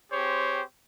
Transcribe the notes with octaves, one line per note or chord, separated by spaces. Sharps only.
C4 G4 G#4 C5 C#5